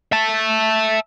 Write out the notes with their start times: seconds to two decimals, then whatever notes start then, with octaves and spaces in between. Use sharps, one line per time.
0.12 E5 A5